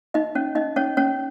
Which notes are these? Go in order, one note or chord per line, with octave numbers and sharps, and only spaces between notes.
D#4 D#5
C#4 C#5
D#4 D#5
C#4 C#5
C#4 C#5